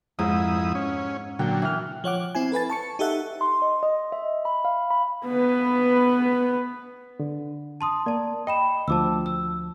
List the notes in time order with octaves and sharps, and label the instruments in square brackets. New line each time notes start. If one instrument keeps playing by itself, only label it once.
[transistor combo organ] F2 E4 D#6 [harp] G#2
[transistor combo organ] C#4
[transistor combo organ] A#2 D3 F#3 [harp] G5
[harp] E3 F6
[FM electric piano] F3 C#5 F#5 D6
C4 E4 G#5
A4 B4 G#5 A6
A5 C#6 C#7
D#4 G4 A4 E5 F#5
[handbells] C6
D#5
D#5
E5
B5
F5
B5
[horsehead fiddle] B3 B4
[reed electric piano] D3
[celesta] A5 C6 D#6
[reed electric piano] A#3 [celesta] D5 A5
[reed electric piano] D#5 [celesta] G5 B5 E7
[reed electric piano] D2 F3 [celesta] A5 D6 E6
[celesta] E6